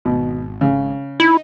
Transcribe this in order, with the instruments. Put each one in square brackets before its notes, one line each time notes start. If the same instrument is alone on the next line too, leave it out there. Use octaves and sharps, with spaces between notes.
[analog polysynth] G#1 [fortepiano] B2
[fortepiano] C#3
[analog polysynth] D#4 [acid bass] E4